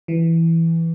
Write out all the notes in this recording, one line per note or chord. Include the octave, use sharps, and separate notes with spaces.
E3